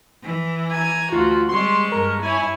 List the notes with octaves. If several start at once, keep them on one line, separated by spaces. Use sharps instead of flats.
E3
G#5 A#5
D2 F4 F#4
G3 G#3 C4 C6 C#6
G2 A#4
E4 C#5 G#5